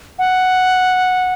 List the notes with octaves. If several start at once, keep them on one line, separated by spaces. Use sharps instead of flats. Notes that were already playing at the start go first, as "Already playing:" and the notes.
F#5